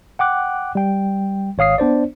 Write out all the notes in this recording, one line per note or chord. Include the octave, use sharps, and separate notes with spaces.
F#5 G5 D6 F#6
G3 G5
G#1 C#5 F5 D#6 C7
B3 D4 C5 D5